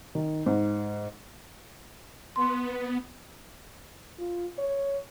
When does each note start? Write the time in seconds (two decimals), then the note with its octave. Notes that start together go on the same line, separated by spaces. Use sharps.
0.15 D#3
0.46 G#2
2.36 B3 C6
4.19 F4
4.58 C#5